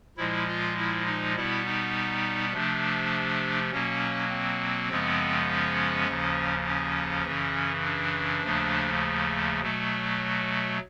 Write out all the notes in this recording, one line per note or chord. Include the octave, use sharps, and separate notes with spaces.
A#2 F3 G#3 E4
F4
E4
D#4
B2 G3 B3 E4
D#4
C3 F3 A3 D4
B2 F#3 A#3 C#4
C4
F#2 C#3 F3 G#3 B3
C#4
D#2 C#3 F3
C#4
F#2 C#3 E3
D4
D#2 C#3 F3 A3
B2 F#3 A3